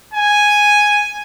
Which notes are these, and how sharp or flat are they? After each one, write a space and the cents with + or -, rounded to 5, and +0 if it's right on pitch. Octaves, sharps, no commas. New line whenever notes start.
G#5 +0